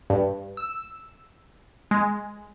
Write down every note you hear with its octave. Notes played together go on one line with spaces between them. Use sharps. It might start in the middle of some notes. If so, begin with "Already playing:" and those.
G2
E6
G#3